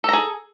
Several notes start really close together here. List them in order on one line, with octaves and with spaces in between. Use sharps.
A4 A#5 G#4